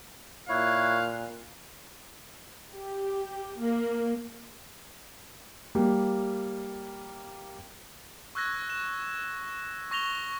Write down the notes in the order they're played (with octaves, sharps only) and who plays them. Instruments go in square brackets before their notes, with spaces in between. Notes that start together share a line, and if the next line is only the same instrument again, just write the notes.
[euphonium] A#2 [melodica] E4 C#5 [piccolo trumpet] F5 [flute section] F#6
[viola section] G4
A#3
[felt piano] G3 A#3
[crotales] C#6 E6 F#6 G#6 A#6
E7
C#6 A#6 F7 G7